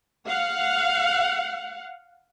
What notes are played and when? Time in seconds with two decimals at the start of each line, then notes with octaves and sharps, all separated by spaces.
0.27 F5 F#5